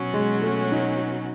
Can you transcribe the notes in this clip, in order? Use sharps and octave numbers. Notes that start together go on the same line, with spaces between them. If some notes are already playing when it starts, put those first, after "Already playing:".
Already playing: B2 F#3 C#4 F#4
G#3
A3
D#4